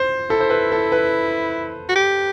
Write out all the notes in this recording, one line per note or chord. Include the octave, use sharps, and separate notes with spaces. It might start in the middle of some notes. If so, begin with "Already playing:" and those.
Already playing: C5
E4 A4
C5
B4
A4
B4
F#4
G4